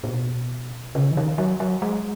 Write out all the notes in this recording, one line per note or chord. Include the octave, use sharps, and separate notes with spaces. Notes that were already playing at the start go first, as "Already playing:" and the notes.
A#2
B2
C#3
E3
D#3
F#3
F#3
G#3